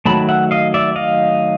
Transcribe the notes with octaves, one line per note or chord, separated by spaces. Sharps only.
D#3 F#3 A3 A5 B5
E5 F#5
D#5 F5
D5 E5
D#5 F5